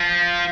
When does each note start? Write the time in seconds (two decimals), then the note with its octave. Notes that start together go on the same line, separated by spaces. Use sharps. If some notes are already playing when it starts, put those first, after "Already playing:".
Already playing: F3